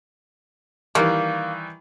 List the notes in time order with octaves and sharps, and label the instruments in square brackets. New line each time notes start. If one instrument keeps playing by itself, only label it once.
[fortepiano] D#3 E3 G3 [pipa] A#3